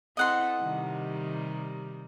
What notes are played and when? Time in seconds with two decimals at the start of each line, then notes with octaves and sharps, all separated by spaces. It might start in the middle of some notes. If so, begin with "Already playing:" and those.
0.17 C4 E4 A4 D#5 F#5 C6
0.59 C3 D#3 G3